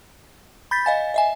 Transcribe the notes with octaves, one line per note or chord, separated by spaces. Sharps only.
B5 G6 A6 B6
D#5 F5 G#5 A6
D#5 E5 G#5